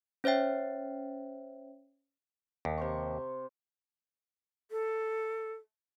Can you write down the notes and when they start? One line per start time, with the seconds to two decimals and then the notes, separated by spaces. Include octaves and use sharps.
0.24 C#4 C5 C#5 E5 G5
2.65 D#2
2.78 C3 C5 C#6
4.71 A4